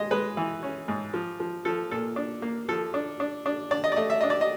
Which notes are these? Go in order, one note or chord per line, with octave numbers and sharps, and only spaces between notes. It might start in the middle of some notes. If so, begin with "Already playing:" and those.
Already playing: G#3 D#5
G#3 B4
E3
C#4
G#2
F3
F3
F3 A4
A#2 A4
D4
A#3
F3 A4
D4
D4
D4
D4 D5
D#5
D5
A3 D#5
E5
D4 D#5
D5
D#5